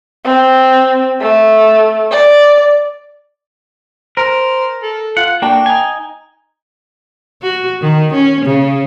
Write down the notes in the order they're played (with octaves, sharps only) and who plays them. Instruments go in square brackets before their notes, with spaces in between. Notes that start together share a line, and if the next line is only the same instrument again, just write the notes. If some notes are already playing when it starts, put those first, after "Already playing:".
[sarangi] C4
A3
D5
[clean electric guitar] A#4 [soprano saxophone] C5
[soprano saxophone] A4
[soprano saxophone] F4 [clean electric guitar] F#5
[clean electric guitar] A#3 D4 F#4 [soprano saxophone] G5
[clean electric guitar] D#4 G#5
[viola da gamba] F#4
D#3
C#4
C#3